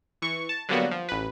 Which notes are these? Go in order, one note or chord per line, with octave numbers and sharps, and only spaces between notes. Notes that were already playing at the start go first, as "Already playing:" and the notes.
E3 C#6
A5
D3 F#3 G3 A#3 B3 F#4
F3
A1 B4